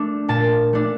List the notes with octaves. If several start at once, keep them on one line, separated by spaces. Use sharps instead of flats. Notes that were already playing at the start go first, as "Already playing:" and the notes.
Already playing: A3 D4
A#2 A5
A3 D4